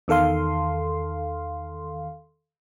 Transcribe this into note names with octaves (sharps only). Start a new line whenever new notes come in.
E2 D#3 A4 F5 C6